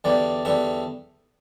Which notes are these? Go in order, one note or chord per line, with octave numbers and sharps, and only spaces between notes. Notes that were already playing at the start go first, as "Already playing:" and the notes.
E2 D3 G3 D5
E2 D3 G3 E5